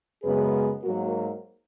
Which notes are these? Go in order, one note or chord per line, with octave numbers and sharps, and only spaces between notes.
F#2 C#3 G#3 B3 G#4 B4
G#2 F#3 A#3 F#4 A#4